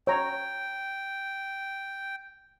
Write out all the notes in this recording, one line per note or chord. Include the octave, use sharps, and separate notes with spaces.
C#5 G5 A#5